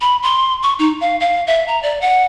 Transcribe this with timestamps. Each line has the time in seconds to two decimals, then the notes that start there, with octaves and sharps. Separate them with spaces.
0.01 B5
0.23 C6
0.63 C#6
0.79 D#4
1.01 F5
1.20 F5
1.47 E5
1.68 A#5
1.83 D5
2.01 F#5